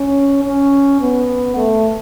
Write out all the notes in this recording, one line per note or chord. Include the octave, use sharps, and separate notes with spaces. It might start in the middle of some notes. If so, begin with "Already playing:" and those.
Already playing: C#4
C#4
B3
A3